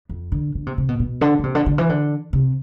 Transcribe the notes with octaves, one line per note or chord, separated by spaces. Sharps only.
F2
D3
D3
C3
C3
B2
B2
D3
D3
C3
D3
D3
E3
D3
C3